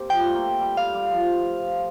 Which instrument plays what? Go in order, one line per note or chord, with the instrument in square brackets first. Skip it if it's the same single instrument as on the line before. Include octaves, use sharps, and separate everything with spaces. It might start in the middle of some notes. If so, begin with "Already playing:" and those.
Already playing: [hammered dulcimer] A#3 C4 G4
[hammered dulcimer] F3 [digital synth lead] G5
[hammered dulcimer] G3
A3
A#3
A3
G3
[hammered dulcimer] G3 [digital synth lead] F5
[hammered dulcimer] G3
F3